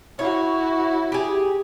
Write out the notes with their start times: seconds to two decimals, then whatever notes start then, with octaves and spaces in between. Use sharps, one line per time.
0.19 E4 F#4 C#5
1.12 G4 G#4